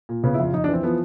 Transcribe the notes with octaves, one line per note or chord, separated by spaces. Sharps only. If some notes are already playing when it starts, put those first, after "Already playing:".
A#2
C#3 B3
E4
F2 F4
F2 D#4
D4
E3 C4
F3 B3